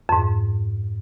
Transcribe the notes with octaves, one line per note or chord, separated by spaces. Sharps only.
F2 G#2